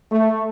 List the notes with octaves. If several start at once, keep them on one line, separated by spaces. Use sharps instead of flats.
A3